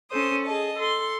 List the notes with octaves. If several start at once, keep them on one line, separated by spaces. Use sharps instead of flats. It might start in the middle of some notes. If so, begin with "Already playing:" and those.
C#4 A4 C5 D#6
G#4 D#5 A5
A4 C6